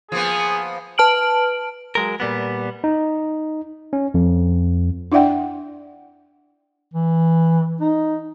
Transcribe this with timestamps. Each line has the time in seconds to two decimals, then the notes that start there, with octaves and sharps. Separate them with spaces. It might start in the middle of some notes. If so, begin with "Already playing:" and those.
0.12 F3 A#3 B3 G#4
0.98 B4 A5 F6 D7 F#7
1.95 F#3 G#3 A#4
2.20 A#2 G3 B3
2.84 D#4
3.93 C#4
4.14 F2
5.12 D4 E4 D5 E5 F#5 G5
6.94 E3
7.81 D#4